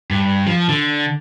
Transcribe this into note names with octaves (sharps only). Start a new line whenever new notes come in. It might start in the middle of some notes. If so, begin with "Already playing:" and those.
G2
F3
D3